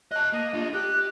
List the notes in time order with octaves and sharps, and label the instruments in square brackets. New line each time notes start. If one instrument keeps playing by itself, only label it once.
[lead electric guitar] D#5 A5 [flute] F#6
[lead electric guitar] A#3 [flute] D#5
[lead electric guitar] D4 F4
[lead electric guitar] G4 [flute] F#6